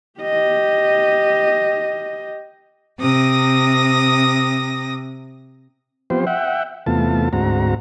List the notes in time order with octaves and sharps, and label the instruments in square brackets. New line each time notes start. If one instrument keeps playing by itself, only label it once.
[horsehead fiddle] G4 D#5
[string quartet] C3 D#6 A#6
[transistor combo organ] F3 B3 C4 G4 C5
E5 F#5 G5
E2 C3 A3 B3 F4 A5
D2 G#2 C4 F#4 A#5